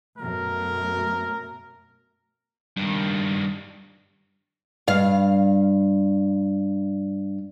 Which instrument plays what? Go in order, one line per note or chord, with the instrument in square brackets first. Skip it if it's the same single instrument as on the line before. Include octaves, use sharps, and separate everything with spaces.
[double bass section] F#2 B2 A3 [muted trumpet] A#4
[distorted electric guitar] G2 D#3
[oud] G2 F5